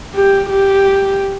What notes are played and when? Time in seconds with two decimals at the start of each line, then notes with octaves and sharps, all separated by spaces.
0.15 G4
0.50 G4